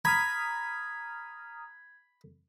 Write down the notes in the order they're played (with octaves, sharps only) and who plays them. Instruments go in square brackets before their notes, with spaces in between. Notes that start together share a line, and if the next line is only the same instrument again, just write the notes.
[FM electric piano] A#5 D#6 F6 [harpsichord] B5 [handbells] G#6